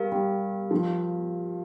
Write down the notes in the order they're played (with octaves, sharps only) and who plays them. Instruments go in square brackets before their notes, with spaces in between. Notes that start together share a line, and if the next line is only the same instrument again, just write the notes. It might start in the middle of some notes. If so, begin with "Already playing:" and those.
Already playing: [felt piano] G3 [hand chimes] G4 A#4 F5
[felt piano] G3
F3